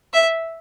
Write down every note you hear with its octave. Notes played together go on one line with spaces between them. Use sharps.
E5